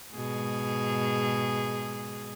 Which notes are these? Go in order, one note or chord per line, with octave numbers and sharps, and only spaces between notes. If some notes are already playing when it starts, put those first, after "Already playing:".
G#2 B2 G#4